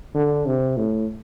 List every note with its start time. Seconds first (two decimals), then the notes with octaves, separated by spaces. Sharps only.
0.15 D3
0.46 C3
0.77 A2